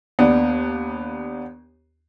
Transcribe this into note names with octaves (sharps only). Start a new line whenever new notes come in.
D#2 B3 D4